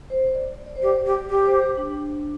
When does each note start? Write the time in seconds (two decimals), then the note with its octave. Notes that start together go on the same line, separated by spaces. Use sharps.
0.10 C5
0.35 D5
0.66 D5
0.76 C5
0.82 G4
0.85 D5
1.06 G4
1.30 G4
1.45 C5
1.62 G4
1.77 D4